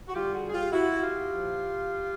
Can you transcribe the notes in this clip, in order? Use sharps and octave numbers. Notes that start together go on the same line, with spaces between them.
F#4
G2 D3 G3 F4 G4
F#4 G#4
G#4
F4 G4
E4 F#4
F4 G4
A#2 F3